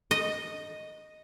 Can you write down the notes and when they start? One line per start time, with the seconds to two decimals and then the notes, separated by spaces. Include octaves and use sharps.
0.11 D#5